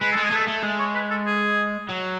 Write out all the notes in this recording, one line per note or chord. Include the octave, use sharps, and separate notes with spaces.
G#3 B4
G#3 A4
G#4
A3 A4
A3
G#3
C#5
B4
A4
G#4
F#3